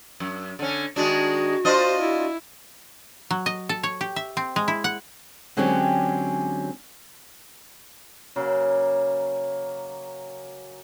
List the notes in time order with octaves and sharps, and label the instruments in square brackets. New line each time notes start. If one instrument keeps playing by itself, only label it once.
[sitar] F#2
D3 C#4
[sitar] D#3 G#3 D4 [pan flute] F#4
[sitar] D4 F4 D#5 [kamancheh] C5
[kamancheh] E4
[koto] F#3
D#5
A4
C#5
G4
E5
C4
G#3
E4
F#5
[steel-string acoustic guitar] D3 F#3 G#3 C4 C#4 G4
[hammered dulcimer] C#3 F#3 A#3